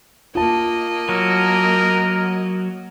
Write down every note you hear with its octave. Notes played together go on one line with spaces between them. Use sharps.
A#3 F4 D#5 A5
F#3 A#4